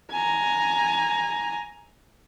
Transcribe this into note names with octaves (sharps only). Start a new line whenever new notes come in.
G#5 A#5